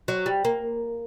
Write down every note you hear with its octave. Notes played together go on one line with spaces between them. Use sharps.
F#3
G3
A#3